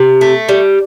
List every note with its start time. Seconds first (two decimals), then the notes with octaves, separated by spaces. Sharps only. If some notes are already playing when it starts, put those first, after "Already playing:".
Already playing: C3
0.21 A3
0.49 G3